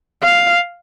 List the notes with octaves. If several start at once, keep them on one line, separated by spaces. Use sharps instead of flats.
F5